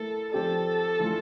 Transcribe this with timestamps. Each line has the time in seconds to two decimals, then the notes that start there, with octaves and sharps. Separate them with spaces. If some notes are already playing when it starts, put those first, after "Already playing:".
Already playing: A3 E4 A4 A#4
0.32 F3 C4 G4 A4 D5
1.00 E3 A3 D4 F4